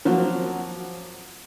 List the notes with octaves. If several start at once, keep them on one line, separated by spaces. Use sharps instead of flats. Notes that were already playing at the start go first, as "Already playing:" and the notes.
F3 F#3 A#3 C4 F#4